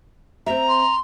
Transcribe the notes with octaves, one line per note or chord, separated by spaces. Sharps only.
C4 E5 A#5
C6